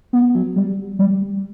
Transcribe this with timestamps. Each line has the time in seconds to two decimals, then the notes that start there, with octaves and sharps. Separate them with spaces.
0.13 B3
0.34 F#3
0.56 G3
0.99 G3